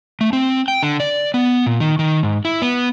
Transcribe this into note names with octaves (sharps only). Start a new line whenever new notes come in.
A3
C4
G5
D3
D5
B3
A#2
D#3
D#3
G#2
E4
B3